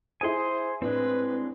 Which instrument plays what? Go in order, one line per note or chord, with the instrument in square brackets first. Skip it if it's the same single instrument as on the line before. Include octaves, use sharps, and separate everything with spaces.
[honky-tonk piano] E4 G#4 D#6 [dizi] C5 [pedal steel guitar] G#5 C6
[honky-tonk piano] A2 D4 [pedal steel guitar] G#3 C4 [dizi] B4